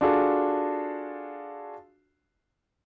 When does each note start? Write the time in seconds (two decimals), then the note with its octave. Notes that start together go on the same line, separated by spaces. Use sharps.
0.01 D4 F4 F#4 G#4 A4